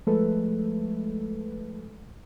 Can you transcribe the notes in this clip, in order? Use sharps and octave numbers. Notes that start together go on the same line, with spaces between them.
F3 G#3 A3 A4 B4